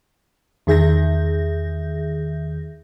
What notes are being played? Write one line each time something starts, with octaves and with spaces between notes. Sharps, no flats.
E2 D#3 G#4 E5 G6 A#6